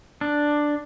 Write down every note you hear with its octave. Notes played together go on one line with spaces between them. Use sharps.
D4